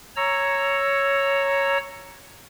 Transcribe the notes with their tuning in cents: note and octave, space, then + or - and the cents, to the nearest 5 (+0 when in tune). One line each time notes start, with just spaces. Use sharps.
C#5 +0 A#5 +0 E6 +15